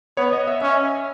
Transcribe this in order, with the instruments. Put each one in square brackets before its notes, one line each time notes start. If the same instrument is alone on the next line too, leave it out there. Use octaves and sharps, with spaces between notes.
[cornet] B3 [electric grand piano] C#5
[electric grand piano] D#5
E5
[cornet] C#4 [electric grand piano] E5